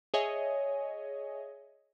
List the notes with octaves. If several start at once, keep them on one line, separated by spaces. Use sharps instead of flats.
G#4 C#5 D#5 E5 G#5